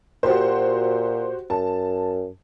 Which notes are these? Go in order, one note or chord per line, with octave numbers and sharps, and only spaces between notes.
A#2 F#4 G4 C5
F#2 A5